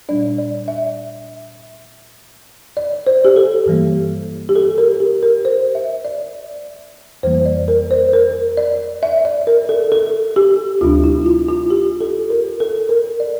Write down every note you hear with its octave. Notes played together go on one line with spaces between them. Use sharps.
A#2 G3 D4 D5
D5
E5
D5
C5
G4
A4
G2 E3 G3 A#3
G4
A4
A#4
G4
A#4
C5
E5
D5
F2 E3 G3 A#3 C5
D5
A#4
C5
A#4
D5
E5
D5
A#4
A4
A4
G4
D2 C3 G3 D4 F4
E4
F4
F4
G4
A4
A#4
A4
A#4
D5